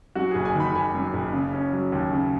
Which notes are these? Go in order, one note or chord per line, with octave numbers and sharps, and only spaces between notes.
F#2 F#4
F#1 G#4
G#5
D#3
B5
F#1 G#5
F#2
F#1
C#3
C#4
F#3
D#2
C#3